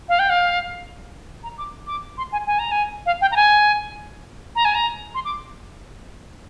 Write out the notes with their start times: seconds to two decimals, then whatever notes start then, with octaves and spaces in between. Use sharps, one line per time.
0.09 F5
0.19 G5
0.30 F5
1.43 A#5
1.58 D6
1.87 D6
2.18 C6
2.32 G#5
2.47 G#5
2.59 A#5
2.71 G#5
3.06 F5
3.21 G5
3.32 A#5
3.36 G#5
4.56 A#5
4.65 G#5
4.75 A#5
5.15 C6
5.25 D6